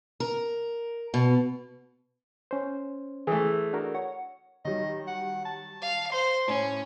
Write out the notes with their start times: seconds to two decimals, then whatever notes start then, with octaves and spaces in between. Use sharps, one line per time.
0.20 A#4
1.14 B2
2.51 C#4 C5
3.27 E3 A3 G#4
3.73 D4 F#4 A#4
3.95 C#5 F#5
4.65 D#3 F#3 G3 D#5
5.07 F#5
5.45 A5
5.82 F5
6.12 C5 C6
6.48 A2 C#4